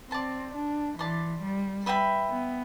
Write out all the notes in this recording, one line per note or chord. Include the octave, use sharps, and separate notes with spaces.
C4 D5 A5 C6
D4
E3 D5 A5 C6
G3
B4 E5 G5 B5
B3